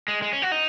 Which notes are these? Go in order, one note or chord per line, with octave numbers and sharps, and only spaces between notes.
G#3
G#3
C#4
F#4
D#4